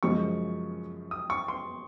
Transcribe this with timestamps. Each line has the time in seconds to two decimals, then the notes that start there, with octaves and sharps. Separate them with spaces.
0.03 F#2 C#3 F3 G#3 C#6
1.11 D#6
1.30 C#6
1.48 C6